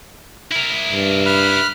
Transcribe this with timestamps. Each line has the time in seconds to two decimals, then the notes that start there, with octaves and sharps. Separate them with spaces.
0.52 E4 A#4
0.92 G2
1.26 B5 F6 F#6